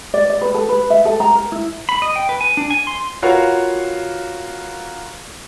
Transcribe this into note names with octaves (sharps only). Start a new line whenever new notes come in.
D5
D5
B4
A4
B4
E5
A4
A#5
A#4
E4
B5
D#5
G5
B4
G#5
D4
G#5
C6
F4 F#4 A#4 B4 C#5 F5